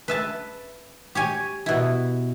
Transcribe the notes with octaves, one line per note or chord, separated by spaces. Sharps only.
B4 E5 A5
G4 C#5 G#5
B2 E4